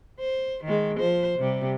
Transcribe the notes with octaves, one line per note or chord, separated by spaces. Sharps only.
C5
D#3 G#3
F3 C5
C3 G3